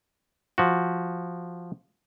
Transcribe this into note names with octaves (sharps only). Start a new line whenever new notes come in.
F3 F#4